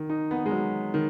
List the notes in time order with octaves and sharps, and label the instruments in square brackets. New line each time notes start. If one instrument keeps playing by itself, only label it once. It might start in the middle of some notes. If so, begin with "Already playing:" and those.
Already playing: [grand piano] D#3
D#4
B3
G#3
F#3
D#3